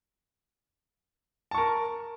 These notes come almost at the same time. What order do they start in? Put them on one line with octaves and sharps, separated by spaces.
A5 C#6 A#4